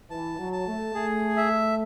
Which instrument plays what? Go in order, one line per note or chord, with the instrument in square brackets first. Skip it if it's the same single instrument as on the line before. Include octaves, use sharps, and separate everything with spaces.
[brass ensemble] E3 [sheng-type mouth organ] A5
[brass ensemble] F#3
[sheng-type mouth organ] A5
[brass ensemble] A3
[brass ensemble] A3 [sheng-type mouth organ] G#4
[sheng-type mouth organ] E5